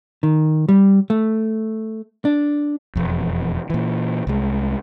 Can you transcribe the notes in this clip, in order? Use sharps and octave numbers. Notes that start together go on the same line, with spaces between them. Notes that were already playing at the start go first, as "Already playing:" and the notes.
D#3
G3
A3
D4
E1 F2
A#2 E3
C2 G#3